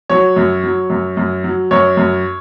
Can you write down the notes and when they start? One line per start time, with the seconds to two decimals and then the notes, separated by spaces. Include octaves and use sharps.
0.10 F#3 C#5
0.36 F#2
0.63 F#3
0.90 F#2
1.17 F#2
1.44 F#3
1.71 F#2 C#5
1.97 F#2